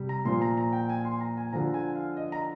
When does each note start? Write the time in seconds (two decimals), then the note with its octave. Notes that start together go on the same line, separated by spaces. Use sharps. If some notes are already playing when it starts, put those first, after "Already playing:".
Already playing: C3 G3
0.09 A#5
0.25 A#2 F3 C6
0.42 A#5
0.57 A#5
0.73 G5
0.89 G#5
1.05 C6
1.21 A#5
1.37 G#5
1.53 D3 F3 A#5
1.74 G#5
1.96 F5
2.17 D#5
2.32 A#5